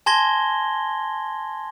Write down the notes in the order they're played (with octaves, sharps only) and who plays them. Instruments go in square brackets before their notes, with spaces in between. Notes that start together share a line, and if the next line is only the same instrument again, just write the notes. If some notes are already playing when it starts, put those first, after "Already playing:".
[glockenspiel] G#5 A5 C6 G#6 A#6 G7